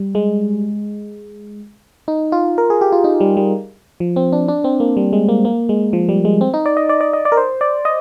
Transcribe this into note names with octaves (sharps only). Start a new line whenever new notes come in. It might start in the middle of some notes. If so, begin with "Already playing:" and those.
Already playing: G3
G#3
D#4
F4
A#4
G#4
G4
F4
D#4
G3
G3
F3
C4
D4
D4
C4
A#3
G3
G#3
A#3
A#3
G#3
F3
G3
G#3
C4
D#4
D5
D#5
D5
D5
D#5
D5
A#4
C5
D5
D#5